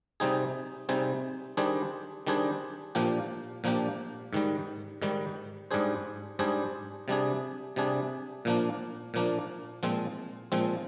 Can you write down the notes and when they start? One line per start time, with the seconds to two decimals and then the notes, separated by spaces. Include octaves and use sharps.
0.20 C3 G3 C4 D#4 G#4
0.89 C3 G3 C4 D#4 G#4
1.57 D#3 G3 D4 G#4 C5
2.27 D#3 G3 D4 G#4 C5
2.95 A#2 F3 A#3 D4 G4
3.64 A#2 F3 A#3 D4 G4
4.33 G#2 D#3 G3
5.02 G#2 D#3 G3
5.71 G#2 G3 D4 G#4 C5
6.39 G#2 G3 D4 G#4 C5
7.08 C3 G3 D4 G#4
7.76 C3 G3 D4 G#4
8.45 A#2 F3 A#3 D4
9.14 A#2 F3 A#3 D4
9.83 A#2 F3 G#3 C4
10.52 A#2 F3 G#3 C4